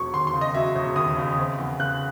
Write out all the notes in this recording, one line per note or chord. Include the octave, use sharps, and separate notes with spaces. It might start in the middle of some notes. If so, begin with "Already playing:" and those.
Already playing: E1 F#3 C#6
D#2 C6
C6
C#3
D#5
F#3 E5
E1
D#2 D#6
C#3
C4
E2
C#3 F#6